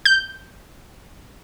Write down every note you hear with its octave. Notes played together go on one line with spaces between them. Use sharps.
G6